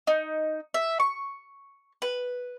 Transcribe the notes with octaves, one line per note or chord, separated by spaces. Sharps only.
D#4
E5
C#6
B4